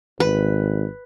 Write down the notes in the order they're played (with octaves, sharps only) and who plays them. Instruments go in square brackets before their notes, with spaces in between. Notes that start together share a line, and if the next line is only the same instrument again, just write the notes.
[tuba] G#1 [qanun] B4